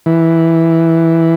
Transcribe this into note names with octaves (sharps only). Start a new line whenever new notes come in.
E3